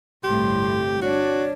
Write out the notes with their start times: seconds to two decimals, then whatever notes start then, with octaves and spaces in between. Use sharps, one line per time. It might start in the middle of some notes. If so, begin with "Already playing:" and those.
0.24 G1 C2 A2 G4 C6
1.02 D4 F#4 C#5